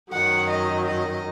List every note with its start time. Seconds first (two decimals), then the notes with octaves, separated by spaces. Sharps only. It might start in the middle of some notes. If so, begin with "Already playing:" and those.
0.13 F#2 D#3 F#3 F#5
0.50 D#5
0.86 D#5